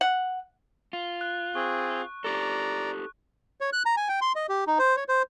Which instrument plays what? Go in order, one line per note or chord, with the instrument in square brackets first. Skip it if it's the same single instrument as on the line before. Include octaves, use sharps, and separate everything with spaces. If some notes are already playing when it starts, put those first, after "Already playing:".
[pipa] F#5
[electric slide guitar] F4
[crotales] F#6
[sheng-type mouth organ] C4 G#4 [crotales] C#6
[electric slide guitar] D#4 G4 A4 [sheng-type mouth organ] D5 A#5
[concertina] C#5
F#6
A#5
G#5
G5
C6
D#5
G4
D#4
C5
C#5
C5